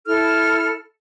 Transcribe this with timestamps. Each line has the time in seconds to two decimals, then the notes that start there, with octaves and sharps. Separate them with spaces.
0.06 E4 A4 F6